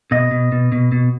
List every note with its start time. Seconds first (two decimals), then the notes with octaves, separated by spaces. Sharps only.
0.11 B2 D#5
0.31 B2
0.52 B2
0.72 B2
0.92 B2